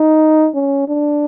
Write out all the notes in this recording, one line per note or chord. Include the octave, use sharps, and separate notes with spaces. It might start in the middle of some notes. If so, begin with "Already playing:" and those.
Already playing: D#4
C#4
D4